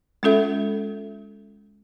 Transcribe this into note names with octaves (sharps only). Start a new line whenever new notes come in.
G#3 C#4 F4 A4 E5